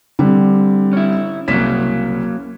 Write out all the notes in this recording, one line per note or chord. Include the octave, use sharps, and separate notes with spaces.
D3 G3 C4
C#4 E4
C2 F#3 A#3 C#4 B6 E7